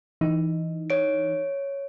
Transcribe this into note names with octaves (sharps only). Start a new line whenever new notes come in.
E3 D#4
C#5 D7